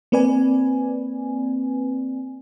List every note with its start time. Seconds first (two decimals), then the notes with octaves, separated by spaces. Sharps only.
0.12 A#3 C4 B4 D5 G#5